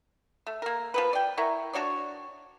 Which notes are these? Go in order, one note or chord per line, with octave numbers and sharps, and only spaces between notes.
A3
A#3 A#4
F3 B3 B4
D5 G5
E4 A#4 F#5 C#6
D4 F#4 C#5 D5